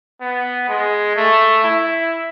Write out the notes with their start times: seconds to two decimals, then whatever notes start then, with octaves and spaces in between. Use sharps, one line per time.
0.21 B3
0.69 G#3
1.17 A3
1.64 E4